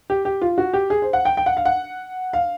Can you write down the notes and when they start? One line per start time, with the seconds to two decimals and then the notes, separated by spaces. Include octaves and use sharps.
0.10 G4
0.25 G4
0.42 F4
0.58 F#4
0.73 G4
0.90 G#4
1.02 C5
1.13 F#5
1.25 G5
1.37 G5
1.46 F#5
1.57 F5
1.65 F#5
2.33 F5